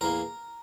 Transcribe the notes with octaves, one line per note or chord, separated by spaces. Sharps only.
E2 E3 A#3 A#4